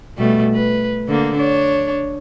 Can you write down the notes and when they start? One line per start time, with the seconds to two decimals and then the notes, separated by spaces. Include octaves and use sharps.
0.17 B2 G3 A3
0.55 B4
1.08 D3 A#3
1.38 D4 C#5